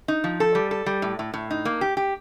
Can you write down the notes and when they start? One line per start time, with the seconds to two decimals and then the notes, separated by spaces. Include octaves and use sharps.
0.08 D#4
0.24 F3
0.40 A4
0.55 G3
0.71 A4
0.86 G3
1.02 A2
1.19 A2
1.34 A2
1.51 D#4
1.65 A#3
1.81 G4
1.97 G4